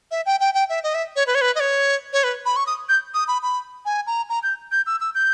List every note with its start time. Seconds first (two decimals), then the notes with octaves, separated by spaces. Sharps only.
0.11 E5
0.26 G5
0.40 G5
0.54 G5
0.69 E5
0.83 D#5
0.94 E5
1.16 C#5
1.27 B4
1.35 C#5
1.41 B4
1.55 D#5
1.60 C#5
2.13 C#5
2.23 B4
2.46 B5
2.56 C#6
2.67 D#6
2.89 G6
3.14 D#6
3.28 B5
3.43 B5
3.85 G#5
4.07 A#5
4.29 A#5
4.43 G6
4.72 G6
4.86 E6
5.00 E6
5.15 G6